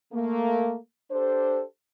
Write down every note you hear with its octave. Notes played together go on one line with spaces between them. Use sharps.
A3 A#3
D4 G4 A4 C5